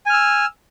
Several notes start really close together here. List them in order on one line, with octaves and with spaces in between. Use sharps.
G#5 F6 E6